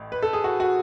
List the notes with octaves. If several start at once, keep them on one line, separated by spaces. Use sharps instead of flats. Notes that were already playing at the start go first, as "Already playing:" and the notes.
Already playing: A1 A2
B4
A4
G#4
F#4
F#4